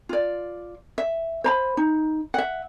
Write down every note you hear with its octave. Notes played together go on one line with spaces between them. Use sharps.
F4 D5
E5
C5 A#5 B5
D#4
E5 F#5